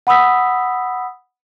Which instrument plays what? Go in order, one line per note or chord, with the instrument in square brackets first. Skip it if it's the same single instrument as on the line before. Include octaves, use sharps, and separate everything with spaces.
[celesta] F#5 B5 D#6 E6 B6